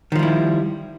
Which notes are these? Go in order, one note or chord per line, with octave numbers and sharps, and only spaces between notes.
D#3 F3 G3 E4